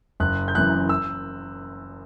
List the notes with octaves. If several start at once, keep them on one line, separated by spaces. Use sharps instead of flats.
F#1 F#6
G6
F#2 E3 F#6
E6